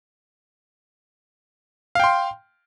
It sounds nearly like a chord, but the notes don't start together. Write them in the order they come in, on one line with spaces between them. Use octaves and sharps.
F5 G5 C6